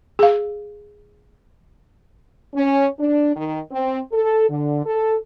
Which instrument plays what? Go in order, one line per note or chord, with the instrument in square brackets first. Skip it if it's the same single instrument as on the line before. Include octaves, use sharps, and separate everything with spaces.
[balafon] G#4 F5
[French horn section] C#4
D4
D#3
C4
A4
D3
A4